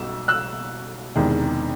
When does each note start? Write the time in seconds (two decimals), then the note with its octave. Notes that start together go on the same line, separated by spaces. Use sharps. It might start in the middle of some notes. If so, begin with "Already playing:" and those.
Already playing: B1 B2 G3 E6
0.28 E6 F#6
1.15 E1 E2 C3 D#3 G#3